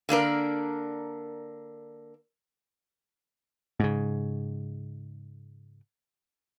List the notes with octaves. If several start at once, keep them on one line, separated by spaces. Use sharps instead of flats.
D3 A#3 D4 A#4
G#2 C#3